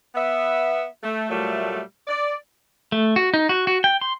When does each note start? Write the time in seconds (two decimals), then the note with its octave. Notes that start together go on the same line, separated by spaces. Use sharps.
0.15 B3 E5
1.03 A3
1.30 A#2 F#3 G3 A3
2.07 D5
2.92 A3
3.16 F#4
3.34 D#4
3.49 F#4
3.67 F#4
3.84 G5
4.01 C6